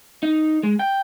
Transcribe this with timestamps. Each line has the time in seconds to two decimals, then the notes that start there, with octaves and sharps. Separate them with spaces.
0.23 D#4
0.63 G#3
0.79 G5